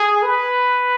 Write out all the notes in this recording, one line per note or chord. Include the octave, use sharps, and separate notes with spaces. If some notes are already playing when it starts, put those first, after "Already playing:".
Already playing: G#4
B4